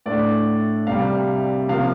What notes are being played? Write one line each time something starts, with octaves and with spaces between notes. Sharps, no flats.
A2 A3 D4 D5
C2 C3 G3 F5
C3 F3 A#3 F5